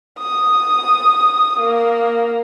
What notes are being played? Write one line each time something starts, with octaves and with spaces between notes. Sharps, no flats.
D#6
A#3